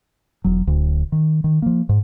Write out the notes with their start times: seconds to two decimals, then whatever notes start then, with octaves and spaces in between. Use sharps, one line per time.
0.44 E1 F#3
0.67 D1 D2
1.12 D#3
1.44 D#3
1.62 F3 A#3
1.89 G#2